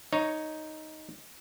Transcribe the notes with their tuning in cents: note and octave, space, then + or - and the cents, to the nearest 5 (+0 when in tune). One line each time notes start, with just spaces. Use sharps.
D#4 +0 C#5 +0